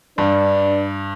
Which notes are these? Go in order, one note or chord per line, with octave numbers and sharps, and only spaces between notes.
G2 D4 B4 D5